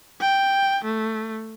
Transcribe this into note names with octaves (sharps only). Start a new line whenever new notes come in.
G5
A3